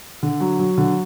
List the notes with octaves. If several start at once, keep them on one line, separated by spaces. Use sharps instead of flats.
D3
F#3
F#3
D3